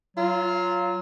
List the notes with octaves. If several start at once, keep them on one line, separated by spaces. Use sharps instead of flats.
F#3 F4